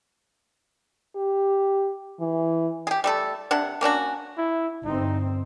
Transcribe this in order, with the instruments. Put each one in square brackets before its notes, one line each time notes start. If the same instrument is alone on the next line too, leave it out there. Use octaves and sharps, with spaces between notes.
[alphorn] G4
E3
[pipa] G4 G#4
G3 A3 A4
C3 D4 F#5
A#3 C#4 D4 F#4
[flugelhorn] E4
[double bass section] G1 C4 [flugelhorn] D#4